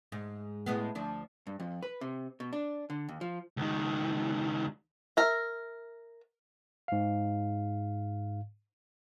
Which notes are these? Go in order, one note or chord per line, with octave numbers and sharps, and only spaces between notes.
G#2
A2 G#3 B3
D2 F3 D4
G2
F2
B4
C3
B2
D4
D3
D#2
F3
C#2 D#3
A#4 E5
G#2 F5